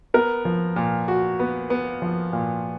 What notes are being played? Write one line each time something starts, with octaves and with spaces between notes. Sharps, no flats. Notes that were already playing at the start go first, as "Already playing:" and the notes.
B3 A#4
F3
A#2
F#4
B3
B3
F3
A#2